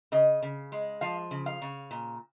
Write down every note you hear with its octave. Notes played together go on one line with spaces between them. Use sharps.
C#3 D#5
C#3
G#3
F3 F5
C#3
F5
C#3
A#2